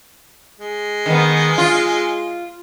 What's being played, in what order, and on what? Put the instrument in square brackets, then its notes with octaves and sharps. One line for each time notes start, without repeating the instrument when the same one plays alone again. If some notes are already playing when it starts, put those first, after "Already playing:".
[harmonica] G#3
[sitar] D#3 B3
F4